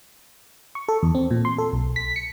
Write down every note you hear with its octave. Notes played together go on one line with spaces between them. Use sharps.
C#6
A4
E2
C4
A#2
C6
A4
B1
B6
C#7